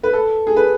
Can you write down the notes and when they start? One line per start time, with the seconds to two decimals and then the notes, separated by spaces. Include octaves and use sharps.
0.03 B4
0.13 A4
0.47 G#4
0.56 B4